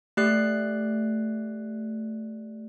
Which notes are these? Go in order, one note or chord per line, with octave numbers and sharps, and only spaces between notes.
A3 G4 D5 F#6 C7